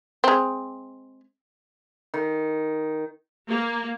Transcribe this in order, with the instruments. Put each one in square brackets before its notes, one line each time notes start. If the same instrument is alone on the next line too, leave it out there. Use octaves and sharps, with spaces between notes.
[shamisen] G#3 C4
[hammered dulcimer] D#3
[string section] A#3